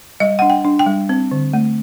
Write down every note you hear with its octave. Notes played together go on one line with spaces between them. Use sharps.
G3 D#5
D4 F#5
G5
D4
G5
G3
C4
D3
A3